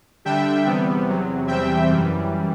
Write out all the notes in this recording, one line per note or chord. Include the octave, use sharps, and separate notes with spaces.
D3 G3 D4 E5 G5
E2 C3 G3 B3
E2 C3 F#3
E2 C3 E3 G3 C4 E5 G5
F#2 E3 G3